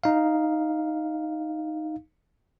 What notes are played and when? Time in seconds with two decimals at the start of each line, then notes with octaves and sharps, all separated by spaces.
0.04 D#4 F5